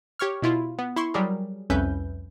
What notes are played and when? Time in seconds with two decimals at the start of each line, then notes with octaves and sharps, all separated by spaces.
0.19 G4 C#5 C#6 F6
0.42 B2 E4 F4
0.78 B3
0.96 E4 C6 C#6
1.14 F#3 G3 G4 G#4 A#4
1.70 C2 F2 C#4 B4 E5 G6